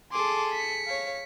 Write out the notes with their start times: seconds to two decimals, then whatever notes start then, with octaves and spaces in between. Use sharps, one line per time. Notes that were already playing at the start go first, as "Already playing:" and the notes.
0.12 G#4 A4 C6 D6
0.53 B6 C#7
0.86 C#5 F5